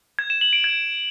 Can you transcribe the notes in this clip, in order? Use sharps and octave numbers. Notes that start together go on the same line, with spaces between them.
G#6
E7
F#7
D7
G#6